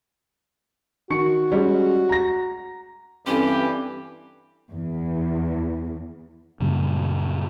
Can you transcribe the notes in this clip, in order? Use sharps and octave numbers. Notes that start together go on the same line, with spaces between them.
D#3 F#4 C#6 C#7
G3 G#3 C#4
A#5 A#6
G2 E3 C4 C#4 G4 A4
E2
F#2 A#2 C#3 G3